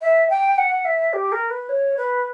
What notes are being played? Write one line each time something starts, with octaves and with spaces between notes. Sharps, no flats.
E5
G5
F#5
E5
G4
A#4
B4
C#5
B4